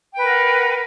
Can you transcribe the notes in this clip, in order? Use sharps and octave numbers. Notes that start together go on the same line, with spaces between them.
A#4 B4 F#5 G5